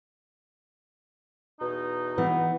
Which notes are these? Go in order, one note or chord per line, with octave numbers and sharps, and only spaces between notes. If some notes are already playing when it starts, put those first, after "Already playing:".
E2 B2 D#4
E3 B3